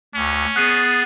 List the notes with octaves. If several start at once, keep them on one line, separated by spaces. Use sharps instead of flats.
D2 C#4
B3 G#4 F#6 A6 C7 D#7